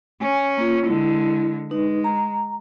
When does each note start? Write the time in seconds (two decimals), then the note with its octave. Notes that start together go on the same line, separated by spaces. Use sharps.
0.21 C#4 G#5
0.57 A#3 F4
0.86 D3 G#3 E4
1.71 G#3 D#4 B4
2.04 A#5